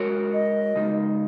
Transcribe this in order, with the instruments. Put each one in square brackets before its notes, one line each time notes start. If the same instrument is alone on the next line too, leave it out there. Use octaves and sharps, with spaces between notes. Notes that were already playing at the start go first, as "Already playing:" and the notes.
Already playing: [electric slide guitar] G#3 F#4 A#4 C#5
[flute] D#5
[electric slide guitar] C#3 G#3 D#4